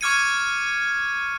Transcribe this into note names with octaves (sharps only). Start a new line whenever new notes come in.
C#6 D6 F6 G#6 C#7 D#7